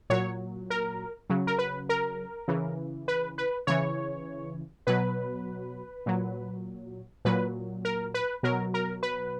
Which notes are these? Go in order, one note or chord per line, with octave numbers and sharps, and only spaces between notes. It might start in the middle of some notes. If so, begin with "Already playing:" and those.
A#2 F#3 C#5
A#4
C#3 F#3
A#4
B4
A#4
C#3 E3
B4
B4
C#3 E3 C#5
B2 F#3 B4
A#2 F#3
A#2 F#3 B4
A#4
B4
B2 F#3 A#4
A#4
B4